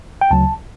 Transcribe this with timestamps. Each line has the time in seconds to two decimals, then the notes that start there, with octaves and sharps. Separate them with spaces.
0.21 G5
0.31 D2 C#3 F#3 A5